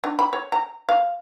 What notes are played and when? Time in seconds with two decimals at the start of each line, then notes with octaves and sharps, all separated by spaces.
0.04 D4
0.19 B5
0.33 C#5
0.52 A#5
0.89 F5